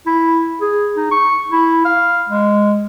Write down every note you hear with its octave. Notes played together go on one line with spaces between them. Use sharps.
E4
G#4
D#4
C#6
E4
F5
G#3